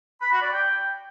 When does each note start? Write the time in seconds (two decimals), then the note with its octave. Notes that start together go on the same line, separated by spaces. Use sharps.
0.22 B5
0.32 F#4
0.42 D5
0.52 G5